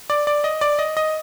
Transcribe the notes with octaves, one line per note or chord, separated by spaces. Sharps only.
D5
D5
D#5
D5
D#5
D#5